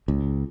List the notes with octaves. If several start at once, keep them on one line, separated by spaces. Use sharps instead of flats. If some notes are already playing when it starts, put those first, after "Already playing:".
C#2